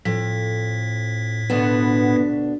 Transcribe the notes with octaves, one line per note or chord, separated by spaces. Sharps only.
F2 A2 B6
D2 B2 B3 D4